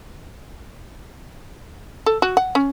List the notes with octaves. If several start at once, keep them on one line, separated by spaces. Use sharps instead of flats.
A4
F#4
F#5
C#4